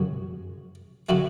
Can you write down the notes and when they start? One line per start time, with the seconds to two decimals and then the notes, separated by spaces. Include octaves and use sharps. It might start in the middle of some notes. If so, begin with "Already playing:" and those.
Already playing: F#2 C#3 F#3 F#4
1.09 C#3 F#3 A3 F#4